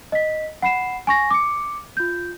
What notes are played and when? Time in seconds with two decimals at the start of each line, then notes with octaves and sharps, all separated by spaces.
0.12 D#5 B6
0.62 F#5 B5 C7 E7
1.07 G#5 C#6 A#6
1.31 D6 C#7
1.97 F4 G6